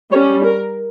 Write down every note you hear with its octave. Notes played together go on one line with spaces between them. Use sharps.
G3 C#4 C#5
A#4